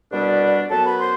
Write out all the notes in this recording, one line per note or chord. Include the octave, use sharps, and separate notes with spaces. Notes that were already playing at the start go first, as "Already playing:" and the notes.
C2 B2 G3 B3 D4 D5
F#2 F#3 B3 A4 A5
B4 B5
C5 C6